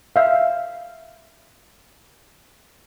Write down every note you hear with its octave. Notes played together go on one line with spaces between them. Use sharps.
E5 F5